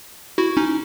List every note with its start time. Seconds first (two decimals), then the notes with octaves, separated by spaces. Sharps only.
0.38 E4 F#4
0.57 C#4 D#4